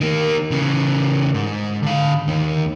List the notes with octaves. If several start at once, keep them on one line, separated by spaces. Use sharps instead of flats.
D#3 A#3
C#3 E3
G#2
D3 F5
D#2 D#3